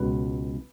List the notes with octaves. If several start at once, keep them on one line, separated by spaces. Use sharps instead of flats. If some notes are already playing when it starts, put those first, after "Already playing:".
Already playing: C#2 B2 F#3 B4